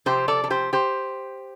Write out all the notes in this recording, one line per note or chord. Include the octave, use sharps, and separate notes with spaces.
C3 F3 C4 G4 C5
A4 D5
A4
G4 C5
G4 C5